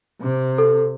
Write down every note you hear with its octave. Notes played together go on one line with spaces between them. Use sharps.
C3
A4